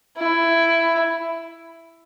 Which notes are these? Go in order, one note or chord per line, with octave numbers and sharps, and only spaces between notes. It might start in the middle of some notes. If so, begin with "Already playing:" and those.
E4